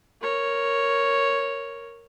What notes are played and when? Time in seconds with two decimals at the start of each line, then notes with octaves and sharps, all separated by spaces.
0.21 A#4 C#5